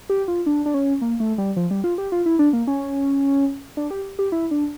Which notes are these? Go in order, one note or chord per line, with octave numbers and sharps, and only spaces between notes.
G4
F4
D4
D4
C#4
A#3
A3
G3
F3
G3
F4
G4
F4
E4
D4
A#3
C#4
D4
G4
G4
E4
D4